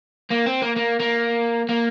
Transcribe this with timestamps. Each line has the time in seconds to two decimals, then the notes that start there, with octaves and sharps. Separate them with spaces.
0.31 A#3
0.46 C4
0.62 A#3
0.76 A#3
1.00 A#3
1.69 A#3